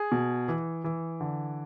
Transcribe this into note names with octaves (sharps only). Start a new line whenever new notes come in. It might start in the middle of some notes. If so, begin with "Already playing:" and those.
Already playing: G#4
B2
E3
E3
D3